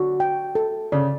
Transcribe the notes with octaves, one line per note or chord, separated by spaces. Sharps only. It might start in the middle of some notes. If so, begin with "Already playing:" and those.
Already playing: D3 F#4
G5
A4
C#3 D5